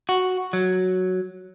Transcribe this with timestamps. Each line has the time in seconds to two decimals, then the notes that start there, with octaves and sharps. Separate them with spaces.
0.09 F#4
0.53 F#3